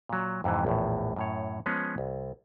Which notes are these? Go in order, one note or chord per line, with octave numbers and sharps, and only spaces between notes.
A#2 F#3
F2 G#2 C3 E3
A#1 E2 A2
F#2 A2 C#5
F3 G#3 B3 C#4 G#4
C2